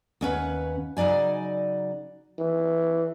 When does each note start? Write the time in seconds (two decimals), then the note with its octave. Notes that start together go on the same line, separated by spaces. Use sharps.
0.21 D#2 C#4 B4 F#5
0.97 C#3 F#3 D#4 D5 G#5
2.39 E3